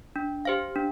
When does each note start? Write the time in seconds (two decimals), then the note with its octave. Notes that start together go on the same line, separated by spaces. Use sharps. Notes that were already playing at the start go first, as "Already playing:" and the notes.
0.16 D4
0.45 G4 C5 F5
0.76 D4